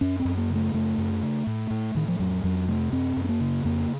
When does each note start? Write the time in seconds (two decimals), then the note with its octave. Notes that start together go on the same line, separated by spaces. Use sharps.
0.01 F#2 C#4
0.20 C4
0.25 F#2
0.38 A#3
0.50 C#3
0.55 A3
0.74 F#2 A3
0.98 F#2
1.22 C#3
1.47 A2
1.70 A2
1.95 A2 D#3
2.08 F3
2.19 F2 F#3
2.44 F2 F#3
2.68 C3 A3
2.93 F#2 C4
3.17 F#2
3.24 C4
3.29 A#3
3.41 C#3
3.65 F2 A#3